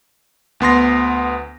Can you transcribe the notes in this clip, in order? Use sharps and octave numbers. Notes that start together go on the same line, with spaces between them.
D2 B3 C6 A#6